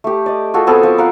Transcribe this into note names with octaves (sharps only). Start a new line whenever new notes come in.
A3 G4
D5 D#5
F4 F#4 G#4 A4
B3 C4 G#4 A4
F3
A#4 F5 F#5